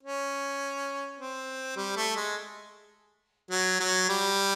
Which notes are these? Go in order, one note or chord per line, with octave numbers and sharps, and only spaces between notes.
C#4
C4
G3
A3
G#3
F#3
F#3
G3